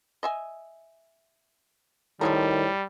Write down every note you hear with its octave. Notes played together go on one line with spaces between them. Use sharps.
D#5 E5 G#5
A2 D#3 F3 G3 G#3 A#4